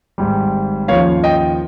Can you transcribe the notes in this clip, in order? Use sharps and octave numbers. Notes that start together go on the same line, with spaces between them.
G#1 G#2 G3
D#2 C#3 F3 C#5 F5
D#5 G5